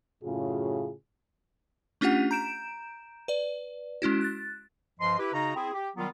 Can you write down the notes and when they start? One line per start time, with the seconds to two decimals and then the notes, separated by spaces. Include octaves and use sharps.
0.24 F#2 A2 C#3 F4 F#4 G#4
2.01 A3 C#4 D4 F4 G4 F#5
2.31 A#5 G6 D7 E7
3.28 B4 D5
4.02 G#3 C#4 E4 F#4
4.21 F#6 A6
5.00 G2 F3 D#5 C6
5.19 E4 G4 B4
5.33 C#3 D#4 F#4 A#5
5.56 C4 E4 G#4
5.73 G4
5.97 D#3 F#3 G3 B3 F4